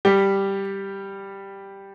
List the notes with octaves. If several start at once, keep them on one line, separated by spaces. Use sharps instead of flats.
G3 G4